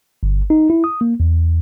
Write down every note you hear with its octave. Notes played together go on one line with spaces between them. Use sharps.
G1
D#4
E4
D#6
A#3
E2